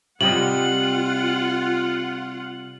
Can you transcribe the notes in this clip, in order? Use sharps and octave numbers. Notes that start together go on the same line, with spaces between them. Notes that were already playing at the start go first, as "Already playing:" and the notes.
C3 G3 F4 D#5 F#5 F#7